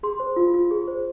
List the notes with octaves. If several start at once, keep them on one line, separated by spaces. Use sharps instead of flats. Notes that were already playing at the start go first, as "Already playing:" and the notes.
G#4 C6
C5
F4
F4
G#4
C5